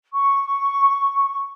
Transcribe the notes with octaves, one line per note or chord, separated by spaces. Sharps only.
C#6